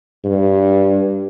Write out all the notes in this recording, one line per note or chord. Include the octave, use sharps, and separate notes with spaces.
G2